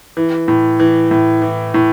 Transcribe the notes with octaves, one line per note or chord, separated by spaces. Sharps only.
E3
A2
E3
A2
E3
A2